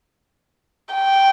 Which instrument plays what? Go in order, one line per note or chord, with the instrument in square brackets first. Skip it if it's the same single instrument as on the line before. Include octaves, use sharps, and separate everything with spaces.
[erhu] G5